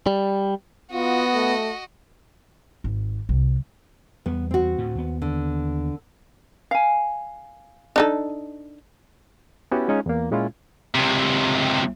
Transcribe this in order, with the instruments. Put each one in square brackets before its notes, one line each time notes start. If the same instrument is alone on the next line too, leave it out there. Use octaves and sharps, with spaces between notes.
[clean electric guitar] G3
[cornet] B3 [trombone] F4 [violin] F#4 D#5
[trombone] A3
[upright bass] G#1
C2
[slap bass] E2 G3 [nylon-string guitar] B3
[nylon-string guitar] C4 F#4
[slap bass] D2 A2
D#2 B3
[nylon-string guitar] D3
[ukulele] F5 G#5
[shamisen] D4 D#4 A4
[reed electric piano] B3 C#4 E4 F#4 G4
G#3 C#4 D#4 F4
E2 A#3
A#2 G#3 C#4 E4 F4
[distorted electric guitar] C#2 C3